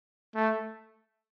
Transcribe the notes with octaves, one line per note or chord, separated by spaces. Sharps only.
A3